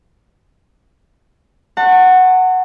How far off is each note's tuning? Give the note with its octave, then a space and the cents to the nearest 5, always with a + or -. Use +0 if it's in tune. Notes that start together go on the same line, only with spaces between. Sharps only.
F#5 +0 A5 +40 C#6 -25